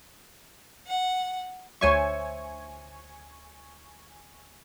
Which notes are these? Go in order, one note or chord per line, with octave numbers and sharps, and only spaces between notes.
F#5
D2 C5 C#5 E5 G#5 C#6